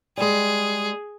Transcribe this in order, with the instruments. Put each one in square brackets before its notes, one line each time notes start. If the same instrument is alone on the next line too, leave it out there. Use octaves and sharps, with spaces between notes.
[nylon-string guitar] G3 G#3 [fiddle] G#4